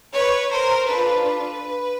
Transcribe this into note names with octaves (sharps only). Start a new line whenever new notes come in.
B4 C#5
A#4 C5
D4 F4 A4 B4
B4